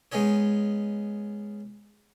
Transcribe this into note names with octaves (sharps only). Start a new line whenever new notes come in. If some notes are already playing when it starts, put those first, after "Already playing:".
G#3 B3 C#4 D#4 C#5